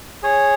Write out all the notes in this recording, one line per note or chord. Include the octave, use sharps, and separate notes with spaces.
G#4 C#5